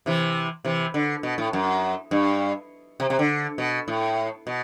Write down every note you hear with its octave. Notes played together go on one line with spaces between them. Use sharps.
C3 E3
C3 E3
D3
B2
A2
F#2
G2
C3
C3
D3
B2
A2
B2